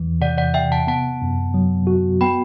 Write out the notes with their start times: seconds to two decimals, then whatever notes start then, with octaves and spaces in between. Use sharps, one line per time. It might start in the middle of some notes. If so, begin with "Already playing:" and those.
Already playing: E2 E3
0.21 C3 D5 F#5
0.37 D5 F#5
0.54 C3 E5 G5
0.72 F#5 A5
0.87 B3 F#5 A5
1.22 F#2
1.54 F#3
1.87 F#4
2.21 B3 G5 B5